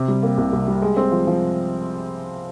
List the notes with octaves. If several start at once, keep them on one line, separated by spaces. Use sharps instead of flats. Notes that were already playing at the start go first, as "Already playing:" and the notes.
Already playing: C3
G3
A#3
C2
C2
G3
G#3
C4
F3
F3